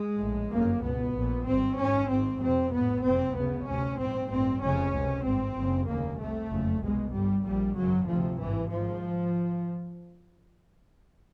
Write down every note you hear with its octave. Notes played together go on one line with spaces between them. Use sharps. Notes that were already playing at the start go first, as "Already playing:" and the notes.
Already playing: G#3
A#1 A2
G1 F#2 C#3 A#3
C#2 B2 B3
A#1 A#2
G#1 G2 C4
G#1 G#2 C#4
G#1 G#2 C4
F1 F2 C3 C4
A#1 A2 B3
F#1 F2 C3 C4
D2 C#3 B3
D2 C3 C#4
A#1 G#2 C4
A1 G2 C4
F1 F2 C#3 C#4
C#2 C3
G#1 G2 C4
F#1 F#2 C#3
F1 D#2 C#3 A#3
C2 C3 A3
F#1 F2 C#3
C2 B2 G#3
G1 G2 G3
A#1 A#2 G3
G#1 F#2 C#3 F#3
D2 C3 F3
G#1 G2 E3
G#1 G#2 F3